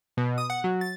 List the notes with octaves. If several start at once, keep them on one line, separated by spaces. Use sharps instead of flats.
B2
D#6
F#5
F#3
A6